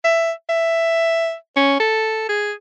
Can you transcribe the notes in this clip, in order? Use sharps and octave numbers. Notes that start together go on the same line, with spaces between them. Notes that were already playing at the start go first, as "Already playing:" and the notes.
E5
E5
C#4
A4
G#4